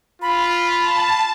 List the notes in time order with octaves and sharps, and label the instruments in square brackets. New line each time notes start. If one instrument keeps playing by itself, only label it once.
[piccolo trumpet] F4 [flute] B5
[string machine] A5